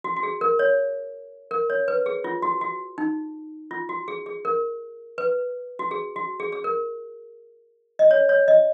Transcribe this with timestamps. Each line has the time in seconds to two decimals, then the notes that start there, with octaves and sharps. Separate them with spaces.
0.04 F#4
0.16 F#4
0.23 G#4
0.41 A#4
0.59 C#5
1.51 A#4
1.70 C#5
1.88 B4
2.06 G#4
2.24 F4
2.42 F#4
2.61 F#4
2.98 D#4
3.71 F4
3.89 F#4
4.08 G#4
4.26 G#4
4.45 A#4
5.18 B4
5.79 F#4
5.91 G#4
6.16 F#4
6.40 G#4
6.52 G#4
6.64 A#4
7.99 D#5
8.11 C#5
8.29 C#5
8.48 D#5